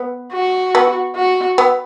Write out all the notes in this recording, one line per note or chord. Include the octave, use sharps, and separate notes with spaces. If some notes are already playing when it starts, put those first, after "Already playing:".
Already playing: B3
F#4
B3
F#4
B3